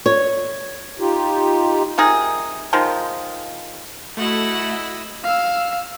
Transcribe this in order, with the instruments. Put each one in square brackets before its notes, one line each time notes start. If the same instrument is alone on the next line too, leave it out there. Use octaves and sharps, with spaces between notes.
[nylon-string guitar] C#5
[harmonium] D#4 F4 G4
[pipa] C3 D#3 D#4 G#4
D#3 F3 G#3
[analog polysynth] A3 E7 [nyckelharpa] E4 D#5 [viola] F#4 F#5
[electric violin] F5 E6